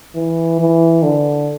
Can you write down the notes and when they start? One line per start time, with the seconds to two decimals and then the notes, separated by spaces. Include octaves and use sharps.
0.16 E3
0.60 E3
1.03 D3